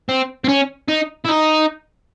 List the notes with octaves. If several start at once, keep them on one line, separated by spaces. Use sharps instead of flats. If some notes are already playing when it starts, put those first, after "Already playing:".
C4
C4
C#4
D#4
E4
D#4